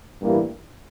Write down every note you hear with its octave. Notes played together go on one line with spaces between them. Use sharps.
A1 G2 E3 G3 A#3